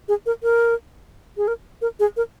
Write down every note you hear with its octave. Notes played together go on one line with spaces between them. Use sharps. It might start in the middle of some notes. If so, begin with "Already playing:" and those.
G#4
A#4
A#4
G#4
A#4
A#4
G#4
A#4